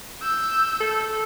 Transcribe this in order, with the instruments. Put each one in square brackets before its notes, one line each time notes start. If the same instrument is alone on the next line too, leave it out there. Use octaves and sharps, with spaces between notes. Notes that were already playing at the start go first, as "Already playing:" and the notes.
[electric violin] E6 G6
[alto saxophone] A4